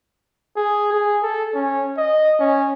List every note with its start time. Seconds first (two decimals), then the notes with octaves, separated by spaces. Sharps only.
0.57 G#4
0.93 G#4
1.23 A4
1.55 C#4
1.98 D#5
2.40 C#4